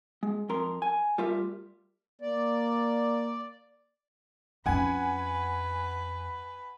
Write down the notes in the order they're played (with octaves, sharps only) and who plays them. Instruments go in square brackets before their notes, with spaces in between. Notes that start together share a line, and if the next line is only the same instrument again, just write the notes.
[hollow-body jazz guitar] G#3
F2 A#4 C6
G#5
G3 A3 F4 A#4 E5
[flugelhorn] A#3 [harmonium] D5
[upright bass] F2 C#4 [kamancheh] B4 [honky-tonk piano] F#5 G#5